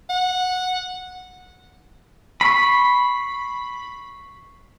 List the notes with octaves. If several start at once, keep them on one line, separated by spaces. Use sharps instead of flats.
F#5
B5 C#6 B6 C7